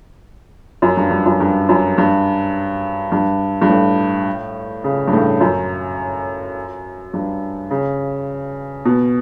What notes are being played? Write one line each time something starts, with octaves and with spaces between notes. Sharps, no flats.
F#2
G2
G2
F#2
G2
F#2
G2
G2
G2
A2
C#3
G2
A2
F#2
G2
C#3
B2